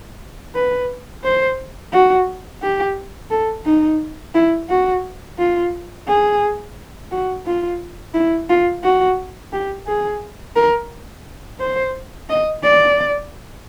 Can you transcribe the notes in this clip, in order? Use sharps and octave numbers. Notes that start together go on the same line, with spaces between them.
B4
C5
F#4
G4
A4
D#4
E4
F#4
F4
G#4
F#4
F4
E4
F4
F#4
G4
G#4
A#4
C5
D#5
D5